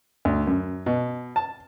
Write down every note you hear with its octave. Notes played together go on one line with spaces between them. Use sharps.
D2
F#2
B2
A5